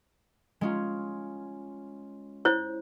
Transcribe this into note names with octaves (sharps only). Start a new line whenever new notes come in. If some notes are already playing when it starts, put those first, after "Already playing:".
G#3 C#4 F4
E4 C5 C#5